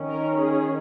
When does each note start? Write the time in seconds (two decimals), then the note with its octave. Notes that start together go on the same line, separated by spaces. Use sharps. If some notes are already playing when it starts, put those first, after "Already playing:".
Already playing: D#3 C#4
0.09 A#4
0.38 G#4